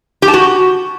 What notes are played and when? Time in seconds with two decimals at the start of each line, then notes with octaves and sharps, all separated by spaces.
0.22 G4
0.28 A5
0.34 F#4